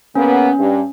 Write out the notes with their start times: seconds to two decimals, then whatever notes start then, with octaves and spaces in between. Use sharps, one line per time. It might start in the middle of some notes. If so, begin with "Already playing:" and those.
0.16 C#3 A#3 B3 C#4
0.59 G2